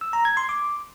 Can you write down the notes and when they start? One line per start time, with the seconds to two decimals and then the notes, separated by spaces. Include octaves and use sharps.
0.01 E6
0.13 A#5
0.25 G#6
0.37 C6
0.49 D6